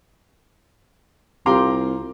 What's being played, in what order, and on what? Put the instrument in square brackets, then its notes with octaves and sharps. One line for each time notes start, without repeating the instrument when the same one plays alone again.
[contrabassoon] C2 [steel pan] F4 G4 C6 [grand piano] F5 A#5 D6